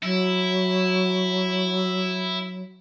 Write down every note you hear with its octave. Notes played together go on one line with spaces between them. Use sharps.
F#3 E4